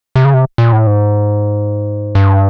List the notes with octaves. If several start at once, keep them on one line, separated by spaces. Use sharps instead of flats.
C3
C#3
C3
A#2
A2
G#2
G2